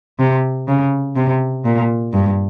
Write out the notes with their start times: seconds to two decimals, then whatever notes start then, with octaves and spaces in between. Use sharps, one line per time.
0.19 C3
0.68 C#3
1.16 C3
1.65 A#2
2.13 G2